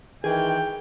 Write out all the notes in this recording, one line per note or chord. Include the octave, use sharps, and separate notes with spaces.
D#3 E3 G#4 G5